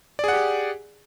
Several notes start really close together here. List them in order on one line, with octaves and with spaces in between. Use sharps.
D5 G#4 F#5 G4